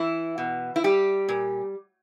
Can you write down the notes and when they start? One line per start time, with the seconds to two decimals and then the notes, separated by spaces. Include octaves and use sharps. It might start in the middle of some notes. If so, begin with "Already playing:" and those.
Already playing: E3 E4
0.38 B2
0.76 E4
0.84 G3 G4
1.29 A#2